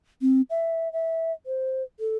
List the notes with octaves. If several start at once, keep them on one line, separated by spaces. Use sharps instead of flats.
C4
E5
E5
C5
A4